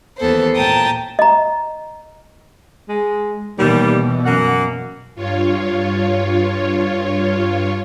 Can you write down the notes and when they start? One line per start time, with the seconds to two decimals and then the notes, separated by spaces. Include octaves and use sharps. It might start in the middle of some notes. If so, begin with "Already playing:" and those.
0.19 D#2 E3 B3 A4 C5
0.56 A#2 G5 A5 A#5 D#6
1.19 D#5 A#5
2.89 G#3
3.59 D#2 B2 E3 G3
4.26 F#2 A#3 F#5
5.15 G2 F4 C#5